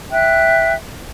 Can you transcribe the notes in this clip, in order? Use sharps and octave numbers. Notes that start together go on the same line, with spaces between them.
E5 G5 F#6